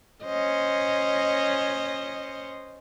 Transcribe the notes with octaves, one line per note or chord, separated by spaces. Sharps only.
C#4 C5 D#5